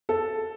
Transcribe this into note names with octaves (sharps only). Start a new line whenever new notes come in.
A4